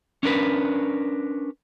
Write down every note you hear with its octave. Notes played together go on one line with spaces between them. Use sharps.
C#4 D4 A#4 B4